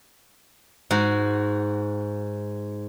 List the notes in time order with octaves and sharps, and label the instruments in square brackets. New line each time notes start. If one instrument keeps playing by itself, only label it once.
[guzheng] G#2 F#4